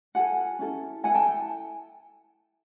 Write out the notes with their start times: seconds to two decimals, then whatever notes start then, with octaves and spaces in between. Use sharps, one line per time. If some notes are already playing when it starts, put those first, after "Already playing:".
0.15 F4 A4 F#5 G#5
0.59 C#4 E4 A4
1.04 E4 A4 F#5 G#5
1.15 G5 A5